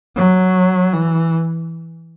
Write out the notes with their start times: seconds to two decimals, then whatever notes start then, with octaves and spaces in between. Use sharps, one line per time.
0.16 F#3
0.93 E3